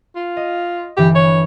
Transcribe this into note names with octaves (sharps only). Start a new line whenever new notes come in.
F4
D#5
G1 E3 G4 G6
B4 C#5